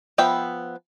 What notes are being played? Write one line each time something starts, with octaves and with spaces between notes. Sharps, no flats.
F3 B3 E5 G5 B5